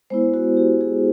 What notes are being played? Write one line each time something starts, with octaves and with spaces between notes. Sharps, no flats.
G#3 B3 E4 C5
F#4
G4
G#4